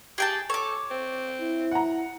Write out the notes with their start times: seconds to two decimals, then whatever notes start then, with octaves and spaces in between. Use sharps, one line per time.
0.18 G4 G#4 G5 A5
0.50 A4 C#5 D6
0.91 C4
1.40 E4
1.71 F#5 A#5